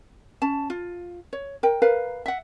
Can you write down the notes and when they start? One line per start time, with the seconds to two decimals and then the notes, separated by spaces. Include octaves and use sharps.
0.42 C#4 A5
0.70 F4
1.33 C#5
1.63 A#4 G5
1.82 A#4 B4 F5
2.26 E5 F#5